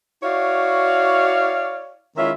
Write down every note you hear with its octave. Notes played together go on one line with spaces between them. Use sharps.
E4 F#4 C#5 D5 F5
D#3 G#3 C#4 E4 F4 E5